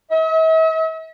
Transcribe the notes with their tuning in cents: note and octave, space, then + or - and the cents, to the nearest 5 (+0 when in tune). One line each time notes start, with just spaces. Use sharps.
E5 -45